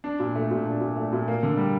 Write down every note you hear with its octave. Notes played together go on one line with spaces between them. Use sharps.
D4
A#2
A3
A#2
D4
A#2
A3
A#2
A#3
D3
G3